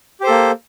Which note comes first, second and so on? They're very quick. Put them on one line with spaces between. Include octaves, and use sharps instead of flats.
G4 C5 A4 A#3